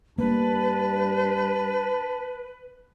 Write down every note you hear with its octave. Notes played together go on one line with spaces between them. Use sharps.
G2 A#3 B4 A5